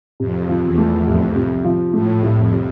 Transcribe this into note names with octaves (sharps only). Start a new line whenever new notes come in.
F2 C3
F3
E2
A3
C2 F2
C3
F3
A2 A3
C2
F2
C3